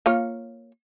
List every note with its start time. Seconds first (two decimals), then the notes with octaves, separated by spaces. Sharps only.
0.06 A#3 F4 C#5